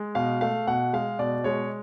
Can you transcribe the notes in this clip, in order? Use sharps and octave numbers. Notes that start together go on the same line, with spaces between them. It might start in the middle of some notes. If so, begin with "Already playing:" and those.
Already playing: G#3
B2 F5
A3 F5
B2 F#5
G#3 F5
B2 D5
G#3 C#5